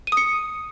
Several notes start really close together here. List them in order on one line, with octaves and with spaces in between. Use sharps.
D#7 D#6 C#7